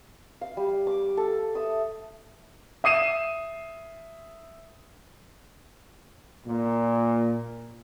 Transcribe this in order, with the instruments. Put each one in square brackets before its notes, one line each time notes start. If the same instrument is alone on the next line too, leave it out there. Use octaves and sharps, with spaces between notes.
[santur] F5
G3
D6
A4
E5 D#6
[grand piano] E5 D#6 C7 D#7 E7
[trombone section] A#2